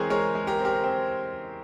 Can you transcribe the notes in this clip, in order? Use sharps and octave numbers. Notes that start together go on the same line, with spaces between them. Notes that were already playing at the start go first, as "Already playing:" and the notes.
Already playing: E3 G#3 C4 G#4 A#4 C5 C#5
G#3 A#4 C#5
G#3
G4 A#4
C4
G4 A#4
C4